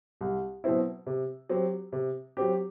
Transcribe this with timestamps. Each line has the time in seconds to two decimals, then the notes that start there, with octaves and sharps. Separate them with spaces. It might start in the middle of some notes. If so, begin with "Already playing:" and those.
0.21 C2
0.64 B2 F#3 C4 E4
1.07 C3
1.49 F#3 C4 G4
1.93 C3
2.37 F#3 C4 G4